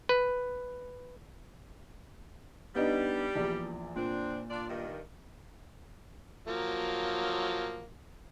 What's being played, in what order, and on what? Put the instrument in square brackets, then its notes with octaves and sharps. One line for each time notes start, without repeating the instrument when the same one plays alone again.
[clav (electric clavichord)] B4
[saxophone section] G3 G4 [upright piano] B3 D4 D#4
[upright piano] A#1 E2 D5
[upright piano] A#2 [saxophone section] C4 D4
[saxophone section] D4 F4 D5
G2 D#3
[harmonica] F3 F#3 A#3